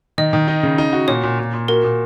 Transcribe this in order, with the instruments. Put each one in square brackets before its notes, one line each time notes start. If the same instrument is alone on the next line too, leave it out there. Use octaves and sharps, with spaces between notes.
[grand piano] D#3 [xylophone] D#5
[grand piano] D#3
D#4
C#3
D#4
F#4
[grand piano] A#2 [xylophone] C#5
[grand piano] A#2
A#2
A#2
[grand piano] F#4 [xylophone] A#4
[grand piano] A#2